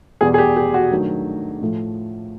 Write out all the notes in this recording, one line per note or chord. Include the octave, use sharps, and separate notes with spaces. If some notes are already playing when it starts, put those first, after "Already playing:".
E2 B2 G3 G#4
G#4
G4
G4
F#4
G2 D#3 F#3 A3
A2 F3 A3